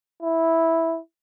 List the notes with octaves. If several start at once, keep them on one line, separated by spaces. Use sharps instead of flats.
E4